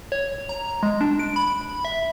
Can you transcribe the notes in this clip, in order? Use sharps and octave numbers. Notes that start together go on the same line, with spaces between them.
C#5
A#5
G#3
D4
D7
B5
E5